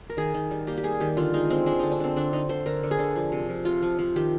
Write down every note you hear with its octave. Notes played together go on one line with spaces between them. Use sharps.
A#4
D#3 G#4
D#3
G3
A#3 G4
G4
G3 G#4
D#3 G4
D3 F4
G#3 D#4
G#3 C4
G#3 D4
D3 D#4
D4
D3 C4
D3 D4
D3 D#4
D3 C5
D3 A#4
D3
G#4
D3
F3
C3
F3
C3 F4
F3
F3
D#3 G4